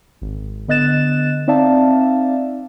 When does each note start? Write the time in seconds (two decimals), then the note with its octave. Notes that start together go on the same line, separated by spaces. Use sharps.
0.21 G#1
0.68 D3 B3 D#5 F#6 A6 E7
1.48 C4 D#4 D5 E5 F5 A5